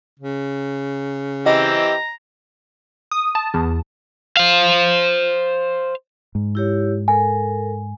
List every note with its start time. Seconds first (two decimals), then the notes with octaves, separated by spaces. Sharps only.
0.19 C#3
1.46 E3 C4 G4 D#5 A#5
3.11 D#6
3.35 A5
3.54 E2
4.37 C5 F5
6.35 G#2
6.55 E4 G4 C#5
7.08 A4 A#4 G#5